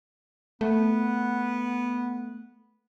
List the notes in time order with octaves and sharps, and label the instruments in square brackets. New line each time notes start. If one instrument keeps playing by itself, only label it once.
[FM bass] A3 [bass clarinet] B3